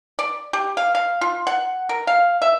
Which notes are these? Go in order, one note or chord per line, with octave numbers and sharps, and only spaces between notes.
D5
G4
F5
F5
F4
F#5
A#4
F5
E5